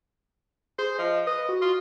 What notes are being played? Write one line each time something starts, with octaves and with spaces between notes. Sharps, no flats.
G#4 C5
F3 D#5
B4 D#5
F#4
F4